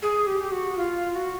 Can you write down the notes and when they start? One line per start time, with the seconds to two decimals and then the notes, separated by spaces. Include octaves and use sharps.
0.02 G#4
0.27 G4
0.43 G4
0.52 F#4
0.77 F4
1.15 F#4